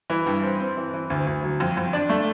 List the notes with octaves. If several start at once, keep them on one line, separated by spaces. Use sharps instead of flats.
E3
G2
C4
C4
E3
E3
D2
D2
F#3
F2
F2
D4
A3